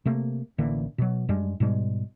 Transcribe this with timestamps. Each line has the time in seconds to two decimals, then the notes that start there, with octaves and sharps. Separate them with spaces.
0.06 C3 A3 A#3
0.58 A1 D3 E3 A#3
0.98 B2 F#3
1.29 F#2 G3 G#3 D4
1.60 G#2 B2 G3 G#3